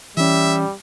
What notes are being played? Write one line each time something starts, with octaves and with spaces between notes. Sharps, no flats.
E3 G3 C#4 E5